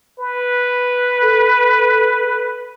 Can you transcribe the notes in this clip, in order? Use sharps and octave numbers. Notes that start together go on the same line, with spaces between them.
B4
A4